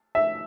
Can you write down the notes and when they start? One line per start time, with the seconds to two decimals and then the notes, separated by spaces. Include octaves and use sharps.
0.15 E5